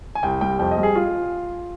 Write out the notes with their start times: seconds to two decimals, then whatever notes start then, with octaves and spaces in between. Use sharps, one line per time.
0.15 G#5
0.23 C2 G5
0.41 G3 G5
0.59 F2 G5
0.71 D#5
0.77 G3
0.83 G#4
0.95 F4